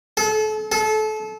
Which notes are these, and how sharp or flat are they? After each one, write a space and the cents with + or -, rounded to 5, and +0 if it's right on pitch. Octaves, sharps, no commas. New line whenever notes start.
A4 -35
A4 -30